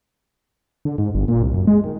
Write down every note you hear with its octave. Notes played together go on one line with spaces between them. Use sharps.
D3
G#2
G1
A#2
C2
F#2
G#3
D#3